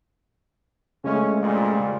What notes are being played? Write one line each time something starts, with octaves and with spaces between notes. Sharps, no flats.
C#3 G#3 A3 C#4
F2 A#2 G3